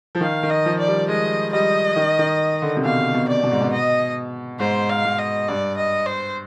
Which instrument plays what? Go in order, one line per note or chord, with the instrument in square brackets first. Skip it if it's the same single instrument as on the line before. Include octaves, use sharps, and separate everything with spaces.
[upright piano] F3
[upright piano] D#3 [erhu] F5
[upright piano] D#3
[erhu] D#5
[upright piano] F3
[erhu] D5
[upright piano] G3
[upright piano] G#3 [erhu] D#5
[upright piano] G3 [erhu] D#5
[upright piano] D#3
D#3
D3
C3
[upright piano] B2 [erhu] F5
[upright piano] B2
[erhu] D5
[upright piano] B2
G#2
B2
[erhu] D#5
[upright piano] G#2 [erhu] C5
[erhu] F5
[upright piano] G#2
[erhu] D#5
[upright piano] G2 [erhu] D5
[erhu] D#5
C5